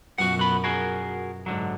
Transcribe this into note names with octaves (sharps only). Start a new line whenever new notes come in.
F#2 B2 F3 F#4 F#5
B1 F#4 B5
F#4 G#4 A#4
G#2 D3 F#3